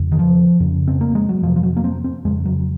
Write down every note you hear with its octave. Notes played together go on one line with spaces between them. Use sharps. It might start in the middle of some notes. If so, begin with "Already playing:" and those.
Already playing: F2 C#3
D#3
F3
F2 C#3
C4
A#3
G#3
F#3
F2 C3 F3
F3
F#3
A#3
C4
C4
F2 C#3 G#3
F#3